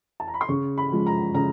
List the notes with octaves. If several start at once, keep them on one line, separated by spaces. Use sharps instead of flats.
A5
A#5
B5
C6
C#3 C#6
B5
F3 G#3
A#5
C#3 A#5